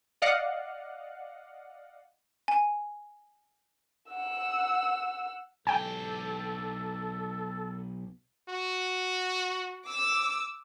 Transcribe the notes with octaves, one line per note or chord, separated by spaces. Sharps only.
D5 D#5 F5 F#5
G#5
F#5 E6
B1 G4 A4 G5 G#5
F#4
D6 E6